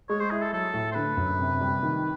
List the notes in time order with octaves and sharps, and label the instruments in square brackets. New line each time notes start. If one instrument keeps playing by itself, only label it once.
[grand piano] G#3 [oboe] C#5
[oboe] C5
[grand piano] E4 [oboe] G#4
[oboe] A4
[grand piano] F#3 [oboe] A4
[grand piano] A2
[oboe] C5
[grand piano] D3 [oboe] B4
[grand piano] F#2
C3
G3
D#3